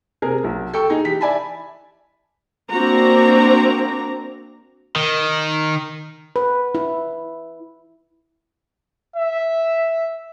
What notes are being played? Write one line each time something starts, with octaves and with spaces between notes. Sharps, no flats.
C3 G#4 A#4
B1
A4 G5 C#6
D#4 G#4
E3 G4 B6
D5 E5 G#5 A5 B5
A#3 C4 D4 F#4 A#5
D#3
B4
E4
E5